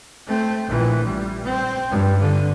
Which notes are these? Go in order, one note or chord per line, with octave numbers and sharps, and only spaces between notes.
A3 C4
A#1 E3
G3
C4
G2
D3